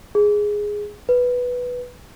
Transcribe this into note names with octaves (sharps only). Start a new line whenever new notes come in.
G#4
B4